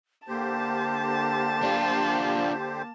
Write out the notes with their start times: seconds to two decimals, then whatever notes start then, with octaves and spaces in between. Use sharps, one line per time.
0.28 D3 A#3 G4 C5 A5
1.63 D4 F4